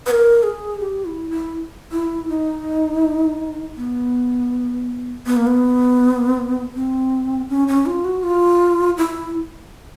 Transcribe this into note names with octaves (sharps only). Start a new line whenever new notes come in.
B4
A#4
G#4
G4
E4
E4
E4
D#4
B3
B3
A#3
B3
C4
C#4
C#4
F4
F#4
F4
E4